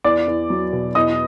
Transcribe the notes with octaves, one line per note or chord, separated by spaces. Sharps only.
E2 D5 D6
E2
F#3
B2
E2 D#5 D#6